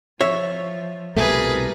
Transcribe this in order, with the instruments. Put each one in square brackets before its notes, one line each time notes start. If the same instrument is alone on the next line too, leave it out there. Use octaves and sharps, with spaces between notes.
[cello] F3 [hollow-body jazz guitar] C#5 E5
[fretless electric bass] C2 B2 A3 [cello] G3 A#4 [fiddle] G#4 B4